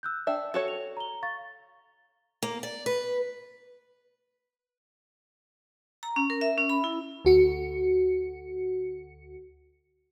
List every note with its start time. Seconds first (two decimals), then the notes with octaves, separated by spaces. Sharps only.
0.03 E6 F#6 G6
0.27 D4 E5 G5 E6
0.54 F#4 A4 C#5
0.68 F7
0.97 A#5 G7
1.23 F5 C#6 A6
2.43 A#3
2.63 D5
2.86 B4
6.03 A#5
6.16 C#4
6.30 A#4
6.41 E5
6.58 C#4
6.70 B5
6.84 E4
7.25 D2 F#4 C#7